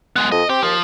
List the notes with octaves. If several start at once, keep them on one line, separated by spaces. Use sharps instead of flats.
G#3 B3
F2 D#5
C4 G4
D#2 F3